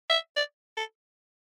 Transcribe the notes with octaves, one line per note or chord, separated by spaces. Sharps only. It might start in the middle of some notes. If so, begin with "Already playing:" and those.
E5
D5
A4